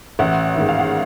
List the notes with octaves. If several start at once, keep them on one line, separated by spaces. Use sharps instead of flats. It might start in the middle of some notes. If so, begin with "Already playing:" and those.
A1 E5 F#5
D#3
G#2
F5
F#5